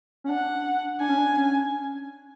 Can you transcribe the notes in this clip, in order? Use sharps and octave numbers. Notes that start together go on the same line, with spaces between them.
C#4
D4 F#5
D4 G#5
C#4
D4
C#4